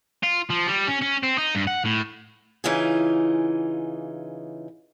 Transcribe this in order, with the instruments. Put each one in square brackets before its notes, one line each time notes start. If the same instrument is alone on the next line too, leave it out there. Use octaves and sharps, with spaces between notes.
[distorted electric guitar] F4
F3
G3
C#4
C#4
C4
D#4
G2
F#5
A2
[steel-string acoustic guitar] C#3 E3 D#4 F4 G#4